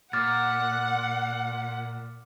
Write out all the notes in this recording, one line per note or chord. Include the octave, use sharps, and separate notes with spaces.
A#2 F#5 D6 F6 A6